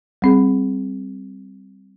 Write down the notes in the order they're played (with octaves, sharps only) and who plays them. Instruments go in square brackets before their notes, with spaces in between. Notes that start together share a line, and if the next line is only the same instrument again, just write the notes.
[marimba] G3 C4 G#4